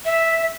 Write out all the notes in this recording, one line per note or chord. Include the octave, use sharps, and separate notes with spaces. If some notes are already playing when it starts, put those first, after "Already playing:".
E5